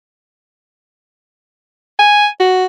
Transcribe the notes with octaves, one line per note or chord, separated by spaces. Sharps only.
G#5
F#4